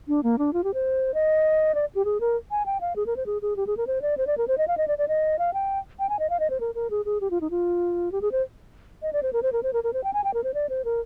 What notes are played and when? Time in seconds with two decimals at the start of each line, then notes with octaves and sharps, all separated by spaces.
0.08 D4
0.23 A#3
0.38 D4
0.53 F4
0.64 G4
0.74 C5
1.14 D#5
1.75 D5
1.95 G4
2.05 G#4
2.20 A#4
2.51 G#5
2.66 G5
2.81 F5
2.96 G#4
3.06 A#4
3.17 C5
3.26 G#4
3.42 G#4
3.56 G4
3.67 G#4
3.77 A#4
3.87 C5
4.02 D5
4.18 C5
4.27 D5
4.38 A#4
4.48 C5
4.58 D#5
4.68 F5
4.78 D#5
4.88 D5
4.98 D5
5.08 D#5
5.39 F5
5.54 G5
5.99 G5
6.09 G#5
6.19 D#5
6.30 F5
6.40 D#5
6.50 C5
6.60 A#4
6.75 A#4
6.90 G#4
7.05 G#4
7.21 G4
7.31 F4
7.41 D#4
7.50 F4
8.12 G4
8.22 G#4
8.32 C5
9.02 D#5
9.13 D5
9.23 C5
9.33 A#4
9.43 C5
9.53 A#4
9.63 C5
9.73 A#4
9.84 A#4
9.93 C5
10.04 G5
10.14 G#5
10.24 G5
10.34 A#4
10.44 C5
10.54 D5
10.69 C5
10.85 A#4